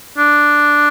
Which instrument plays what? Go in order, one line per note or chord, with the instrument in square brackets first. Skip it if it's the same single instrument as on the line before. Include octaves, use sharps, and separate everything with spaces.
[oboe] D4